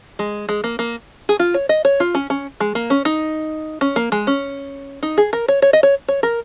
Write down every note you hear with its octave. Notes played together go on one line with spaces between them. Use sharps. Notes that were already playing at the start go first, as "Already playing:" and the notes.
G#3
G#3
A#3
A#3
G#4
F4
C#5
D#5
C#5
F4
C#4
C#4
G#3
A#3
C#4
D#4
C#4
A#3
G#3
C#4
D#4
G#4
A#4
C#5
C#5
D#5
C#5
C#5
A#4